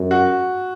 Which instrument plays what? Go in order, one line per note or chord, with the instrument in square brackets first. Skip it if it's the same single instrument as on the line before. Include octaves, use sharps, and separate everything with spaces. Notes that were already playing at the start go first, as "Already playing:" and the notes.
Already playing: [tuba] F#2
[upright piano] F#4